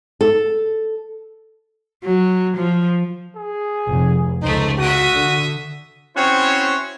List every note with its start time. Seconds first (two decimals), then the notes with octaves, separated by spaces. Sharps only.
0.21 A4
2.04 F#3
2.57 F3
3.36 G#4
3.87 F1
4.42 C#2 A3 D#4 C5
4.78 F#4 E5 D#6
5.14 D3
6.17 C4 C#4 E4 F#4 C5 C#5